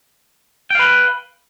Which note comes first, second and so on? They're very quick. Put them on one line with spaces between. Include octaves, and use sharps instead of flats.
G5 F5 B4